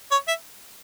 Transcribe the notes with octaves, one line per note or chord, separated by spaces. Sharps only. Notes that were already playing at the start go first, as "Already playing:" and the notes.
C#5
E5